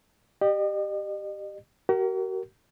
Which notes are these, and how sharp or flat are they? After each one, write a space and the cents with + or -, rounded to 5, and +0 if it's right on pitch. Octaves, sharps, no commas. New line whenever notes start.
G4 +0 D#5 -40
F#4 +45 A#4 -5